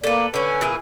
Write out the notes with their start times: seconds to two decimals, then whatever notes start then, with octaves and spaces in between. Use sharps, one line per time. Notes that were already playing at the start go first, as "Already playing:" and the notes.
0.04 A#3 A4 B4 D5
0.34 D3 C#4 B4 G#5
0.61 A#2 E3 G#4